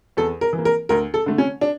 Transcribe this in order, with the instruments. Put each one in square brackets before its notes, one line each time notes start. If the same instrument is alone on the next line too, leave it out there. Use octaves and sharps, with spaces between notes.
[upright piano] E2 A4
A#4
E3
A#3
A#4
D2 A#4
A4
D3 A3
C#4
D4